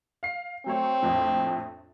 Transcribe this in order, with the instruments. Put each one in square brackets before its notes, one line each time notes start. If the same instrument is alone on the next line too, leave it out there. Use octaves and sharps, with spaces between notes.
[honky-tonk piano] F5 C7
[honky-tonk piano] F#3 A3 C#5 [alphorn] C4
[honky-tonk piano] A#1 F2 A2